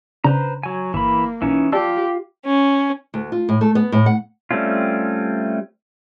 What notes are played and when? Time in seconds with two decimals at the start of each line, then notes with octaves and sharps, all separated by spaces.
0.24 C#3 D4 B4 C5 A#5
0.63 F#3 G#5
0.94 G1 E3 A#3 B5
1.42 B1 E3 C#4 D#4
1.72 F4 G4 D5 A5 E6
2.45 C#4
3.14 D2
3.32 F4
3.49 A2
3.61 A3
3.75 B3
3.92 A2
4.06 F#5
4.51 G3 A3 C4 C#4 F4